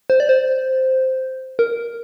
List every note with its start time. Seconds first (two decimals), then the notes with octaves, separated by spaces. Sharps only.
0.10 C5
0.20 D5
0.29 C5
1.59 A#4